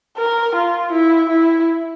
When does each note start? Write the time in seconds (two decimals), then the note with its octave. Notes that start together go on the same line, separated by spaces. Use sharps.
0.17 A#4
0.55 F4
0.92 E4
1.30 E4